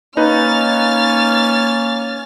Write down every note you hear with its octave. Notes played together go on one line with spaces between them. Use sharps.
A#3 C#4 D#4 B4 F6 A6